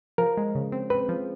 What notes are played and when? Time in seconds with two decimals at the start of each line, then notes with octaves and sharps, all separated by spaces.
0.18 F3 A#4
0.37 G#3
0.55 C#3
0.72 C4
0.90 C4 B4
1.09 F3